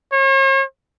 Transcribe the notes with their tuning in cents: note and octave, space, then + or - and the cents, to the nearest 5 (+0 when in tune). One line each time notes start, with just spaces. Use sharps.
C#5 -45